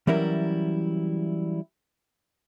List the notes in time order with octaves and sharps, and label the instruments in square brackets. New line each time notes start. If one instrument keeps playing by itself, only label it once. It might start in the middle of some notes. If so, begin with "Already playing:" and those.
[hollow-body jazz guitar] E3 F#3 G3 C#4 E4 A#4